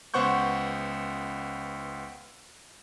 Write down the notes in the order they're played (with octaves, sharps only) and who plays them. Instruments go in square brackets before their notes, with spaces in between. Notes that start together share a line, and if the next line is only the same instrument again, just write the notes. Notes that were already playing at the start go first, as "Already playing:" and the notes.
[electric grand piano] C#2 B3 C5 F#5 C#6 G6